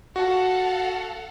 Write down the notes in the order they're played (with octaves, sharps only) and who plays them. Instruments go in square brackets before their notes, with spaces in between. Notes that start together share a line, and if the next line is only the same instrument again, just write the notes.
[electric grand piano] F#4 [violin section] A4 F5 F#5